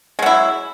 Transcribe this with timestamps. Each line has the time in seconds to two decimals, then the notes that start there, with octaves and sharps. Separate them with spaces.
0.19 G#3
0.22 F#3
0.26 E4